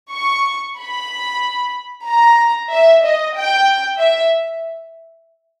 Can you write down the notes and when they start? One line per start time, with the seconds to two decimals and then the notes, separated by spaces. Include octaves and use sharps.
0.12 C#6
0.77 B5
2.06 A#5
2.71 E5
3.03 D#5
3.35 G5
3.99 E5